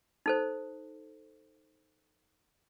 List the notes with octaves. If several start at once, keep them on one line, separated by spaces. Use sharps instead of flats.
D#4 A4 C5